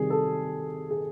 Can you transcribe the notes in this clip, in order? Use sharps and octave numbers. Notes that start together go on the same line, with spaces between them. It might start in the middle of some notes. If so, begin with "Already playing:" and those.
Already playing: C3 D#3 G3 G#4
A4
G#4